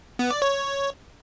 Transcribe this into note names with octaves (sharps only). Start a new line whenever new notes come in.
B3
D5
C#5